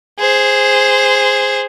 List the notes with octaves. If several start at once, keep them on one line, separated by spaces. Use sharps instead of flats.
G#4 C5